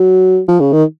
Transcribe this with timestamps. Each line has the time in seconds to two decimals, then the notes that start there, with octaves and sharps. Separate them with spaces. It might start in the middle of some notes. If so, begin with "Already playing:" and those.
Already playing: F#3
0.48 F3
0.60 C#3
0.73 D#3